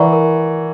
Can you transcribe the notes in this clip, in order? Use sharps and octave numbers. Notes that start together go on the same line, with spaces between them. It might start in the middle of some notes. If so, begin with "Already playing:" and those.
Already playing: E3 A#4 D5 F#5 A#5 C#6
A#4